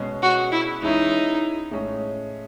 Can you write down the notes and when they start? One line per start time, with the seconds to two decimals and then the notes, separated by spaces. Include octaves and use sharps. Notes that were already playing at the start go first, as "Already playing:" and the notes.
Already playing: B2 G#3 C#4 G#4
0.22 F#4
0.52 E4
0.82 E3 G#3 C#4 D#4 E4
1.71 A2 G#3 C#4